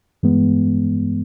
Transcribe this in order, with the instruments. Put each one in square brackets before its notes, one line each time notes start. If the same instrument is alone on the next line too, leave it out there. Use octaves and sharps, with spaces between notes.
[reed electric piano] G2 E3 G#3 B3